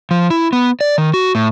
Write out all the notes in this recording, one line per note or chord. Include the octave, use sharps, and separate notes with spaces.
F3
E4
B3
D5
D#3
F#4
A2